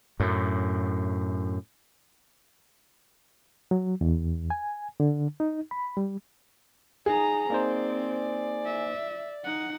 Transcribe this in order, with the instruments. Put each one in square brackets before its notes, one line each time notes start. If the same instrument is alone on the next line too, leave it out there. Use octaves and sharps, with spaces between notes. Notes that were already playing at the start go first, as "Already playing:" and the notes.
[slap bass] F#2 A2
[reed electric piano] F#3
E2
G#5
D3
D#4
B5
G3
[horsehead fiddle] D#4 A#5 [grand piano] G#4
[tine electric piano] A#3 D#4 C5 [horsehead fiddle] C4 [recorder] D5
[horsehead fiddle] E5
D#4 F#5